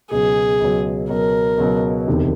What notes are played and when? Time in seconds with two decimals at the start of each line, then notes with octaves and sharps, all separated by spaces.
0.10 C#2 B2 F#3 G#4
0.60 C#2 B2 F#3
1.09 C#2 B2 F#3 A#4
1.58 C#2 B2 F#3
2.07 E1 D2 C3 D#3